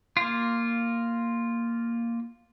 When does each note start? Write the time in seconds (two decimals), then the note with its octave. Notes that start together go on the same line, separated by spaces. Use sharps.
0.17 A#3 F4